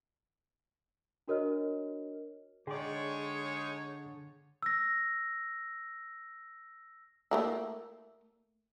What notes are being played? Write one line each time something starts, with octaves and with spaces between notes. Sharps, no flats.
D4 F#4 A#4 C#5 D#5 F6
D3 G#3 D#4 G#4 C#5 D5 G5 C6
E6 A#6
A3 A#3 E4